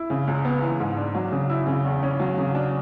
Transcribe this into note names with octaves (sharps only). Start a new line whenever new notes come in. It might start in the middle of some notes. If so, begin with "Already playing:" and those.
Already playing: E4
C#3
C#2
B3
E3
G#2
D4
F#3
C#3
E4
C#3
E2
C#4
F#3
C#3
D4